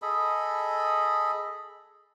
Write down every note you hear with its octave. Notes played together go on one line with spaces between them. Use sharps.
G#4 A4 D#5 B5